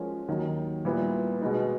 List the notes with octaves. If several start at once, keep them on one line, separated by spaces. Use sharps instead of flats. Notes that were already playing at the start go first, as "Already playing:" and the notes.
Already playing: F3 G#3 C#4 F#4 A#4
D#2 D#3 F#3
A#2 G3 B3 E4
B2 G#3 B3 D#4